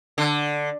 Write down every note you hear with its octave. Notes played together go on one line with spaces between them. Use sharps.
D3